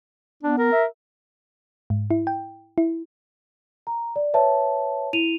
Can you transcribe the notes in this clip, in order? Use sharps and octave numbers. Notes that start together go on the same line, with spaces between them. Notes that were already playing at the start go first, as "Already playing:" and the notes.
B3 D4
A#4
E5
G#2
E4
G5
E4
A#5
D5
B4 C#5 E5 A5
E4 D#7 F7